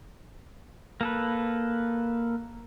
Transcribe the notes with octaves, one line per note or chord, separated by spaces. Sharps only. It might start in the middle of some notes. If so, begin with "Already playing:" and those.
A#3 A4 B4